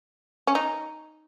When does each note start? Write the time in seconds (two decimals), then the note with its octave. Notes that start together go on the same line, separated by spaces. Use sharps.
0.47 C#4
0.55 D#4